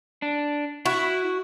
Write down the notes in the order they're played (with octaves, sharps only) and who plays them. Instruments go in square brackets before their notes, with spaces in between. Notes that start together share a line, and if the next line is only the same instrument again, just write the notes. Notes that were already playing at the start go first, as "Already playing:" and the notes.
[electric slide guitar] D4
[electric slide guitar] E4 [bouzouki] F#4